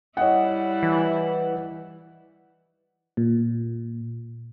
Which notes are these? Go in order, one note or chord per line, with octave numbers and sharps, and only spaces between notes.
G3 E4 C#5 D#5 F#5
E3
A#2